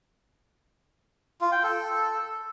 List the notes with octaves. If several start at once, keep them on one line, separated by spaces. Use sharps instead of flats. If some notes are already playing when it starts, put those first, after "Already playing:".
F4
G5
A4